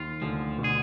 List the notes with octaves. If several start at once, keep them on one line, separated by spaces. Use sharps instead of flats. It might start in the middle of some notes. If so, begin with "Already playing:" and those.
Already playing: D#2 D#3 F4
D2 D3 F3
B2
D3 G#4